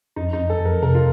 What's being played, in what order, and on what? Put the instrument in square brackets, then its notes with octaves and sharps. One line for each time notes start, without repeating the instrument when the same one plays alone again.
[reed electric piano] F2 [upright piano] D#4
[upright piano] D#4
[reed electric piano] F2
[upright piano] A4
[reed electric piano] F2
[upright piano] A#4
[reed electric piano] C3 [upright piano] A#4
[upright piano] F4